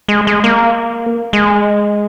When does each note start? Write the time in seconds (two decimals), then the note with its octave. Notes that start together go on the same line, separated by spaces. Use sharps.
0.08 G#3
0.27 G#3
0.44 A#3
1.33 G#3